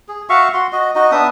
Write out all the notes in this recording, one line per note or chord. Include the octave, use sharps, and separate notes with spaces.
G#4
F#4 E5 F5 C#6
F#4 C6
F#4 D#5
D#4 F#4 D#5
B3 D4 E5 D#6